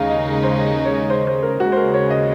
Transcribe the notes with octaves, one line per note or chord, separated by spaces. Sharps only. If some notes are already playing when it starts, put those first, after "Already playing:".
Already playing: D#2 C#3 G#3 D#4 F5
D#5
C5
D#5
C#5
C5
C5
A#4
D#2 C#3 G#3 F#4
C5
A#4
C#5
D#5